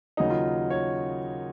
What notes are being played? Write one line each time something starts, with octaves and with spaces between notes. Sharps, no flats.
D#2 C#3 F#3 D#4
F4
C#5